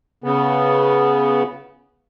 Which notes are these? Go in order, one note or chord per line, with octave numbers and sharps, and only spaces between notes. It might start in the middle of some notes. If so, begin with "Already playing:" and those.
C#3 B3